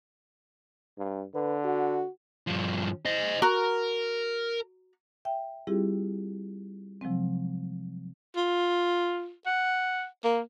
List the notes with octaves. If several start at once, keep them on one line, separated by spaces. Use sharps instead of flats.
G2
D3 B4
F#4
G2 F3
C5 D#5
F#4 A#4 A#5
E5 G5
G3 C4 E4 F4 G4 G#4
C3 F3 F#3 G#3 C4
F4
F#5
A#3